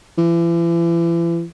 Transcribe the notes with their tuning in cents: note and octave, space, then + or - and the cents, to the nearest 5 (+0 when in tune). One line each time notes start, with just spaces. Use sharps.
E3 +40